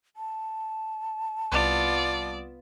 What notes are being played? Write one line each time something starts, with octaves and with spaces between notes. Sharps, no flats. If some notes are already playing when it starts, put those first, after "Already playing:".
A5
C2 B3 F4 D5 D#6 E7